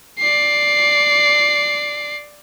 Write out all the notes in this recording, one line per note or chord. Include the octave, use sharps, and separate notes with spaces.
D5 C7